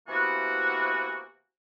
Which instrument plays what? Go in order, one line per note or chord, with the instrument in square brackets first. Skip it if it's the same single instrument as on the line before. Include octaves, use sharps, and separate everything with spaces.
[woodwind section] C3 E3 A#3 B3 F#4